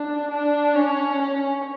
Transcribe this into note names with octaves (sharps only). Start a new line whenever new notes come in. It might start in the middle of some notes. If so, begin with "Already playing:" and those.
Already playing: D4
D4
C#4
C#4